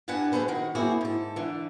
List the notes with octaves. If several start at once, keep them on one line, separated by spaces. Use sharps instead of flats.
G2 B3 D4 B4 F#5 G#5
F#3 G#4 A4 B4 C5
D#3 F#4
F#3 A#3 C4 E4 F#4 G#4
G#2 A4
D3 E3